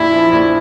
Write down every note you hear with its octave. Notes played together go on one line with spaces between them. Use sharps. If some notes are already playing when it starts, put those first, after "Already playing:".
Already playing: A#1 E4
F3
A#1